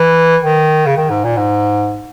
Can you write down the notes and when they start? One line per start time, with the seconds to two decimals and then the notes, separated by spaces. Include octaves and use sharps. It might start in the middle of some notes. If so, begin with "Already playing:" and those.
Already playing: E3
0.43 D#3
0.86 C#3
0.97 D#3
1.10 G#2
1.24 A#2
1.37 G#2